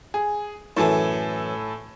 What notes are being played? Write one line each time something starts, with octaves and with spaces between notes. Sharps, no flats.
G#4
F#2 A2 E3 A4 G#5